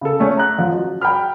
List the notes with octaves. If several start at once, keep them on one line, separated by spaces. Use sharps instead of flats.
C#3 A4
A3 C#4
A#5 F#6
A1 F3
F#3
G5 A#5 B5 F6